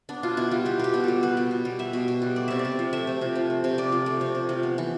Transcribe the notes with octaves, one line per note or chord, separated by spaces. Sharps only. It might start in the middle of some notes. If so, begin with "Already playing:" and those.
B3 D4
B2 F4
B2 E4
G3 F4
B3 G4
B2 G4
B2
G3 A4
B3 B4
B2
B2
G3
B3 E5
B2
B2
G3
A3 D5
C3 E5
D5
C3
F3
A3 E5
C3
C3
F3
A3
C3
C3 D5
F3
A3
C3
C3
F3
B3
E3